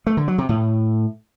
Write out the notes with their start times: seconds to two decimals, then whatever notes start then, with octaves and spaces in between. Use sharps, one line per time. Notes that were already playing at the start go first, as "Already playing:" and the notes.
0.07 A3
0.17 D3
0.28 F#3
0.38 C3
0.49 A2